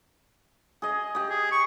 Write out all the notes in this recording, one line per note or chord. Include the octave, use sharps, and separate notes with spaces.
G#4 D#5
G4 D#5
G#4
C#6